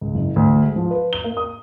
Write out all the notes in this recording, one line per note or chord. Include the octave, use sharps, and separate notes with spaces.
C#2
F#1
D2
G#3
F3
B4
G7
A#3
D#6